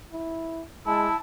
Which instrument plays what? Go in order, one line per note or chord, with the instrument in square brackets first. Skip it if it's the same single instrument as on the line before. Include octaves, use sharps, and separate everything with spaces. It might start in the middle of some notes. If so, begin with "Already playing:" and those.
[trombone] E4
[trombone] G#3 [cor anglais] E4 [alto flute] A5